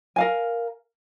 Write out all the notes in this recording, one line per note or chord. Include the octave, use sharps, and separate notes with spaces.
A#4 F5 G#5